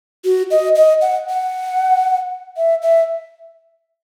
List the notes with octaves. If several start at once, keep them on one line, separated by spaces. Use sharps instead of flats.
F#4
D#5
D#5
F#5
F#5
E5
E5